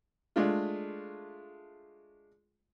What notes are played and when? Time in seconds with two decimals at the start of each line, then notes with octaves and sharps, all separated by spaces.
0.36 G#3 A3 D4 F4